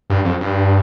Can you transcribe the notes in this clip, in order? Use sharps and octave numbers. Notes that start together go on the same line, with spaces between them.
G2
F2
G2